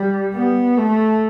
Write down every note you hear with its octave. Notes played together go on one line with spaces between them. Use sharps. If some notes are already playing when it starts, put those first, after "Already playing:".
Already playing: G3
B3
A3